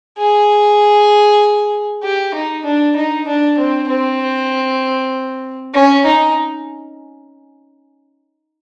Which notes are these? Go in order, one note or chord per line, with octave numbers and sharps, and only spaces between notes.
G#4
G4
D#4
D4
D#4
D4
C4
C4
C#4
D#4